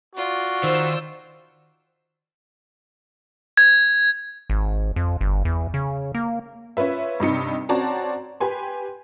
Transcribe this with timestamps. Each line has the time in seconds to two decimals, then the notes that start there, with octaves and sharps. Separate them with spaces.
0.15 F4 F#4 D5
0.64 D#3 C5 E6
3.57 G#6
4.50 G#1
4.96 F2
5.21 G1
5.45 E2
5.74 C#3
6.15 A#3
6.77 C#4 F4 B4 E5
7.20 G2 C3 D#4 C#7
7.69 C4 C#4 F#4 D5 A5 A#5
8.40 G4 B4 G#5 C6